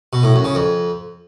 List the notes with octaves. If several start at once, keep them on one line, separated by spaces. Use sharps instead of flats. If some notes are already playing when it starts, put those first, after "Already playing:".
B2
A2
F#2
C#3
F2